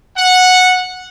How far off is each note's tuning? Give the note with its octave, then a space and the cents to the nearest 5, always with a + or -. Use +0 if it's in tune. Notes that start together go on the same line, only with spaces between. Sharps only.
F#5 -10